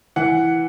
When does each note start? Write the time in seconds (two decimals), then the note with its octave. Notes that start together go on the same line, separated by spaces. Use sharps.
0.16 E3 F#5